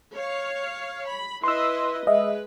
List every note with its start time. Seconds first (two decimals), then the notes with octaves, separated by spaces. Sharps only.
0.15 C#5 F5
1.07 B5
1.44 E4 B4 D#5 C6 E6
2.07 G#3 B4 D#5 E5